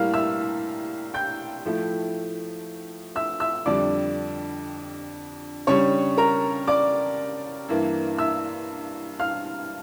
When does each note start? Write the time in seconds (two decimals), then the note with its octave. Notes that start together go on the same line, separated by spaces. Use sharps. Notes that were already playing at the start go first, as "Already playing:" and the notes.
Already playing: A2 G3 A#3 F5 F6
0.13 E5 E6
1.14 G5 G6
1.65 A2 F3 A3 E4
3.15 E5 E6
3.40 E5 E6
3.66 F2 D3 G3 D5 D6
5.67 C#3 G3 D4 C#5 C#6
6.17 A#4 A#5
6.67 D5 D6
7.69 G2 E3 A#3 E4
8.19 E5 E6
9.20 F5 F6